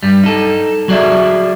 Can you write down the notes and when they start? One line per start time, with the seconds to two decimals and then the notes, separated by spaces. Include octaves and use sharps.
0.03 G2 G3
0.24 D#4 A4
0.88 F#3 F#4 G#4 D5 E5